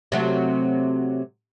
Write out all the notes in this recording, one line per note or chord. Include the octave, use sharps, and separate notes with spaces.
C3 F#3 A3